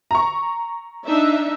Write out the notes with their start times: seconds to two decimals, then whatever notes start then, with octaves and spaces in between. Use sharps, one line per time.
0.11 A#5 C#6
1.06 D4 D#4 E5